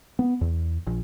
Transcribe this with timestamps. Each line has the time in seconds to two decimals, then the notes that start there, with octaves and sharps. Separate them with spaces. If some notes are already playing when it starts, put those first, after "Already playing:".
0.19 B3
0.41 E2
0.87 A#1